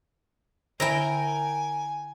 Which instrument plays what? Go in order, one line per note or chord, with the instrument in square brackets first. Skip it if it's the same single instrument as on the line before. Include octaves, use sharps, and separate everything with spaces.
[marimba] D3 [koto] E4 A#5 [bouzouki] A#4 G5 [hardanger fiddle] G#5